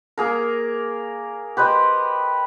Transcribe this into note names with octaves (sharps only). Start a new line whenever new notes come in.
A#3 G#4 A#4
G4 B4 C5 D#5